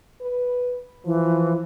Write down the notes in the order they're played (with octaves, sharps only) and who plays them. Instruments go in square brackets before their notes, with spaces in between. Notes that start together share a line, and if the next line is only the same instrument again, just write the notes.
[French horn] B4
[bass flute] E3 [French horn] F3